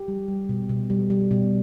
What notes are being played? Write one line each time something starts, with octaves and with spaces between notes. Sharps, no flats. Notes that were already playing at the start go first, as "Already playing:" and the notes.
Already playing: G4
G3
G3
B2
B2
G3
G3
B2